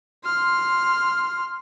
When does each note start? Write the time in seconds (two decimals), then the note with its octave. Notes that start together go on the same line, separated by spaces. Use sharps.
0.24 C6 F6